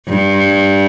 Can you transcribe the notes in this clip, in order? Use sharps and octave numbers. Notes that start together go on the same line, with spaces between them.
G2